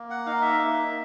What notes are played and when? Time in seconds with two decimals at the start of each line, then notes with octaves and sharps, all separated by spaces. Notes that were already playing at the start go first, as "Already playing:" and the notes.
Already playing: A#3
0.10 F#5
0.26 D#4 F5
0.42 E5
0.59 A#3